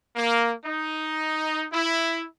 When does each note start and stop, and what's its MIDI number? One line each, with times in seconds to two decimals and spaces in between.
0.16 0.54 58
0.65 1.67 63
1.73 2.25 64